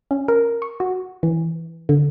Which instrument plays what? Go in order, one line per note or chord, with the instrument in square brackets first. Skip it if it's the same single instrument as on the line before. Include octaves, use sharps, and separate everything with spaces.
[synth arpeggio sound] C#4
A#4
C#6
F#4
E3
D3